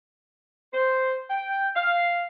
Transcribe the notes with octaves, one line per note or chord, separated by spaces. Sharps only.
C5
G5
F5